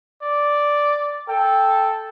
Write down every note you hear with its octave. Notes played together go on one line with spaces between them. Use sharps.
D5
A4 G5